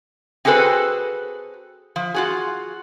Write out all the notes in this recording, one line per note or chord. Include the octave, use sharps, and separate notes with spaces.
C4 F#4 G#4 A4 B4 C5
F3
F4 F#4 G#4